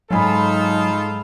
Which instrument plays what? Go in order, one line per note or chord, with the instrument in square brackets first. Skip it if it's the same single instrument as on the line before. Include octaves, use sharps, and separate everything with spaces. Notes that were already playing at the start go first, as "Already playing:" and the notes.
[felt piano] G#2 G#5 B5 [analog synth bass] F#3 [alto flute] D#4 [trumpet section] F4 A4